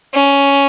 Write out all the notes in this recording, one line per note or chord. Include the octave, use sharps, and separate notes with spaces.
C#4